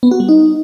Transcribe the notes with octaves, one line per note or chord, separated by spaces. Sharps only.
B3
F#4
G3
D#4